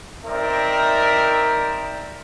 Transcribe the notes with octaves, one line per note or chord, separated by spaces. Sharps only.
C4 D#4 A#4 D5 E5